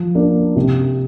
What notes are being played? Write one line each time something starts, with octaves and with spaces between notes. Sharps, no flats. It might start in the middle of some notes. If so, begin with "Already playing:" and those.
Already playing: F3
A#3 D4
C3